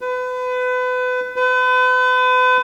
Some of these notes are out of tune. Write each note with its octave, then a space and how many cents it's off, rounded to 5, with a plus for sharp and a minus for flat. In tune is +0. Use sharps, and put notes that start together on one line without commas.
B4 +30
B4 +40